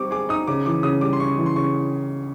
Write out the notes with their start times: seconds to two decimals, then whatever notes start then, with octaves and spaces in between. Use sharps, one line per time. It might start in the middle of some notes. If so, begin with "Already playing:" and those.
Already playing: G3 C4 D#4 C#6 D6
0.11 G#4 D6
0.29 D#4 D#6
0.47 C#3 D6
0.66 E3 D6
0.83 C#3 D#6
1.01 G3 D6
1.13 C6
1.20 C#3 C#6
1.37 E3
1.46 C6
1.56 C#3 C#6